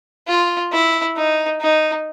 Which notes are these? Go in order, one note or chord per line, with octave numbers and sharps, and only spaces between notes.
F4
E4
D#4
D#4